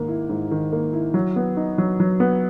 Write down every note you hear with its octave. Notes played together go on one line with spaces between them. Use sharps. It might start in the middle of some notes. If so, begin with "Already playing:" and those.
Already playing: G#2 D#3 A#3
E4
G#2
D#3
A#3
E4
F#3
B3
D#4
F#3
F#3
B3